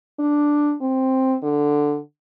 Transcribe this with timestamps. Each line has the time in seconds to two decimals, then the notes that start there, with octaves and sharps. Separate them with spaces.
0.19 D4
0.81 C4
1.43 D3